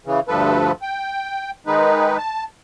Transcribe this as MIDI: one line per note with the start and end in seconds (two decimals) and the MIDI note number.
0.06 0.20 49
0.06 0.20 52
0.28 0.72 38
0.28 0.72 43
0.28 0.72 53
0.28 0.72 69
0.28 0.72 71
0.82 1.51 79
1.67 2.17 51
1.67 2.17 56
1.67 2.17 63
1.67 2.17 71
2.17 2.44 81